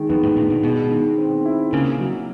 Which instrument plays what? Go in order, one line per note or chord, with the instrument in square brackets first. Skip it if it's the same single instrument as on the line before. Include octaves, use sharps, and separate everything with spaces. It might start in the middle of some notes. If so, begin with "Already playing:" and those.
Already playing: [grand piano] D#3 G#3
[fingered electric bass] F2 [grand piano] B3
[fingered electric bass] A2
[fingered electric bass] A#2 [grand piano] D4
[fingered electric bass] B2
[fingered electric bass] B2 [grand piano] G#3
[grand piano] D#3
C4
E4
[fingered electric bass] C#3 [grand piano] A#3
[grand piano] F#3